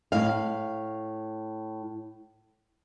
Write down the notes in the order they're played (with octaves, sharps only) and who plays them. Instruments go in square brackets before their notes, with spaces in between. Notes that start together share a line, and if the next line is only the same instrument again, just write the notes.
[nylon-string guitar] A2 F5